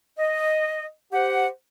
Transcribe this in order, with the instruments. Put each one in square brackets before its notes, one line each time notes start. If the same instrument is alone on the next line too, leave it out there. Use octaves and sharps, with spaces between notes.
[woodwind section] D#5
G4 C5 F#5